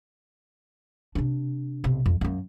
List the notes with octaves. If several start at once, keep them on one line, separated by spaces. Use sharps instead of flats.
C3 D4
B1 C3
F2
F#2 A#3